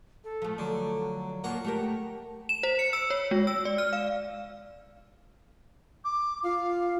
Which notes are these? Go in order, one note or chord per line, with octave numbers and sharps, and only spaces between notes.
A4
F3 A3
D3 F#3
F3 A#3 F#5 C#6
A3 G4 A#4
E7
C5
C#7
E6
C#5
G#3
E6
D5
F6
F5
D6
F4 F5